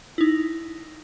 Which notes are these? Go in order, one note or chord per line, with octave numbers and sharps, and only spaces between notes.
D#4 E4